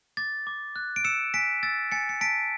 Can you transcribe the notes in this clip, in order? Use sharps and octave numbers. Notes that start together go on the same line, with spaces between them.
D6 A6
D6
F#6
D7
E6 C#7 E7
G#5 B6 D7
E6 A6
G#5 A6 C#7
C#7
A5 B6 D7